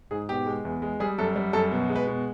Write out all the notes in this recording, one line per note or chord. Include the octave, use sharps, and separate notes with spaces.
G#2 G#4
B2 G4
G#3
E2
G#3
G3 G#4
F#2 A4
G3
F#2 A4
B2
G#3
B4
B2